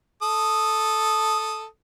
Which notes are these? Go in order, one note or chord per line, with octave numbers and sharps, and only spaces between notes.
A4 D#6